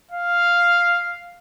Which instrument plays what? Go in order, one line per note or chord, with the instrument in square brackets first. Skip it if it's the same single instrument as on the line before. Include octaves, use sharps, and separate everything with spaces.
[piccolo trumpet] F5